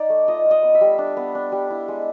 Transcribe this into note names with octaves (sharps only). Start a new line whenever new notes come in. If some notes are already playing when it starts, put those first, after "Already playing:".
Already playing: D#4 D5
A3
F4 D#5
F4 D#5
B3
E5
G3
D4
B3
D4
G3
E4
G#3